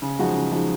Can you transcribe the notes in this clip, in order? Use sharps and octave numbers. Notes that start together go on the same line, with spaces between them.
C#3
F3 G#3 D#4 F#4
C#3
F3 G#3 D#4 F#4